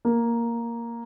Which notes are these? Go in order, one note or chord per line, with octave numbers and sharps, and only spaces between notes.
A#3